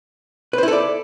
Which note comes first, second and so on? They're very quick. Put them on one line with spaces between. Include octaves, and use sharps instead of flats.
B4 C5 E4 A4 D5